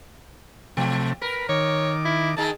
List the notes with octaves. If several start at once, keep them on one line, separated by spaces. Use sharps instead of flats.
C3 F3 A3
A#4 B4
D#3 C#5 D6
E4
D#3 D#4 G#4 A5